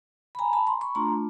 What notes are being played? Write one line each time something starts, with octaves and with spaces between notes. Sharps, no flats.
B5
G#5 A#5
A5 B5
A#5 C6
B5 C#6
A3 D4 F4 A#5 C6